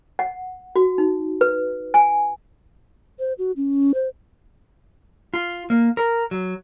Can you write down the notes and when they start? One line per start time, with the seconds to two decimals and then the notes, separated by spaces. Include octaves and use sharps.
0.19 F#5
0.76 F#4
0.98 D#4
1.41 B4
1.94 G#5
3.19 C5
3.38 F#4
3.57 C#4
3.94 C5
5.34 F4
5.70 A#3
5.97 A#4
6.31 F#3